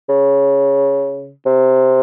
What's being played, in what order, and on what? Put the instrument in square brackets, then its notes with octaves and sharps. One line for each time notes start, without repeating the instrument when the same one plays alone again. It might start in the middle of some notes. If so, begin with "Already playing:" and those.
[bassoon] C#3
C3